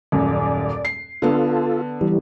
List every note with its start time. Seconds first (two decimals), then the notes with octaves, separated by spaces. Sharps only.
0.12 D#1 F#2 D5
0.85 C7
1.22 D3 B3 F4 A4
2.01 E3 G3